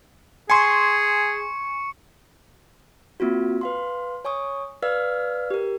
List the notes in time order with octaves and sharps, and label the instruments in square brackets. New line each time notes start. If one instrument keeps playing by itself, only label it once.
[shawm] G#4 [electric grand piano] G#5 C6 [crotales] C#6 C#7
[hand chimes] A#3 C4 F4 F#4
B4 F5 C6
C#5 G#5 C#6 D#6
B4 D5 F5 E6 F6
G4 A#4